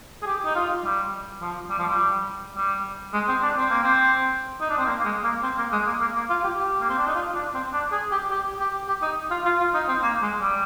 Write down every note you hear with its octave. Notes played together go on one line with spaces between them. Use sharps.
G#4
G4
D#4
F4
G3
F3
G3
F3
G3
G3
G#3
C4
D4
C4
A#3
C4
D#4
D4
C4
A#3
A#3
G#3
A#3
C4
A#3
G#3
A#3
A#3
A#3
F4
G4
G4
A#3
C4
D4
D#4
F4
D4
C4
D4
G#4
G4
G4
G4
G4
D#4
F4
F4
F4
D#4
C4
A#3
G#3
G3